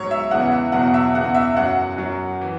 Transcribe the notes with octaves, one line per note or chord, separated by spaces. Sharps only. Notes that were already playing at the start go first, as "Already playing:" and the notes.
Already playing: G#2 F#3 C#5
E5
E2 C#3 E3 F#5
E5
E2 B2 F#3 F#5
E5
E2 C#3 E3 F#5
E5
F#2 F#3 F#5
F#2 F#3
E3